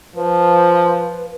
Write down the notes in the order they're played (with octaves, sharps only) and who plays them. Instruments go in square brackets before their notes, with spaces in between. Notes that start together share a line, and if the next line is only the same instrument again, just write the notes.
[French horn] F3 [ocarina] B4